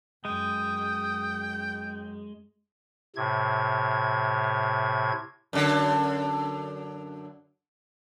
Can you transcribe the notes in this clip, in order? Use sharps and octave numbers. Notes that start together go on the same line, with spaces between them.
F#2 G#3 G5 D#6
A2 C3 G#6
F#2 D3